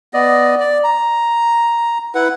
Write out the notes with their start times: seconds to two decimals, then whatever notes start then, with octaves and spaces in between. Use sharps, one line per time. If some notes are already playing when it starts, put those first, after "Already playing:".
0.14 B3 D5 D#5
0.60 D5
0.84 A#5
2.15 E4 B4 F#5